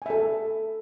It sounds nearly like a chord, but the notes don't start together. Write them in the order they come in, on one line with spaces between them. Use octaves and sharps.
G#5 E5 A4